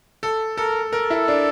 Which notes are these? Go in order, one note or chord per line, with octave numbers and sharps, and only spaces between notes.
A4
A4 A#4
A4 A#4
E4
D4